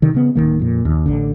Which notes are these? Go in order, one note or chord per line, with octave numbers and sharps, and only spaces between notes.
C3 D#3
C#3 B3
D1 G1 D#3 A#3
F2 A#2
D#2
A1 D3